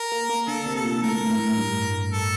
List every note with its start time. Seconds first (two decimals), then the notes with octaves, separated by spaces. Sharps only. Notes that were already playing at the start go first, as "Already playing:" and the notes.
Already playing: A#4
0.12 A#3
0.30 A#3
0.47 D3 A4
0.66 C3
0.76 A4
0.84 A#2
1.03 A2 A#4
1.21 A2
1.39 A2
1.57 G2
2.12 A4